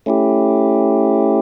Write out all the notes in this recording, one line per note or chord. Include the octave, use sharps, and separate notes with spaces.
A3 C#4 E4 G4